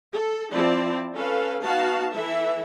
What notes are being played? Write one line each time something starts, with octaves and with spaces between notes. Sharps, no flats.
A4
F3 C4 E4 D5 A5
C#4 A4 B4 F5
B3 D#4 F#4 F5 A5
E3 E4 A4 E5